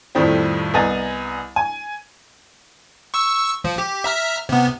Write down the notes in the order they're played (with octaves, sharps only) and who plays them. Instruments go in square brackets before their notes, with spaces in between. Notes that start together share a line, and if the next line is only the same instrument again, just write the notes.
[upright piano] F2 A2 D#3 F3 G3 C4
C2 B3 D#5 G#5 A#5 A6
G#5
[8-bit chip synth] C#6 E6
F3
G4
E5 A#5 F6
C3 B3